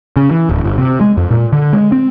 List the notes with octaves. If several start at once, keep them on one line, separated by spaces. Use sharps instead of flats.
C#3
E3
D1
G1
C3
G#3
F2
A#2
D3
G#3
C4